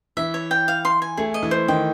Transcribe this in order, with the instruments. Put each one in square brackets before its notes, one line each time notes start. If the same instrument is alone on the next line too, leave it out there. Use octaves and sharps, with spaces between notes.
[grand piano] E3 [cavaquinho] E5
[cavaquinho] C#5
G5
F5
C6
G#5
[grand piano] A3 [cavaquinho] G#4
[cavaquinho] D#5
[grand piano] E3
[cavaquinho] C5
[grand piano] D#3 [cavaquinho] G5